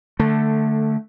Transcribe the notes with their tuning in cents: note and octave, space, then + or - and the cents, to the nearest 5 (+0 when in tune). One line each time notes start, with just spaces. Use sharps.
D3 +10 A3 +0